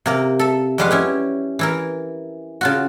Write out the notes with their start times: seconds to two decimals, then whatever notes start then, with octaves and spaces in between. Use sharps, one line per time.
0.06 C3 A#3 A#4
0.39 A4 E5
0.78 F2 G3 G#3 B4 F5 F#5
0.91 C#4 E4 G4
1.59 E3 E4 A#4
2.61 C#3 F4 F#4